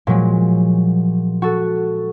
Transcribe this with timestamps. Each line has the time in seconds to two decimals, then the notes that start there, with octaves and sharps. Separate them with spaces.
0.07 A#2 F3 F#3 G#3
1.42 F#4 A4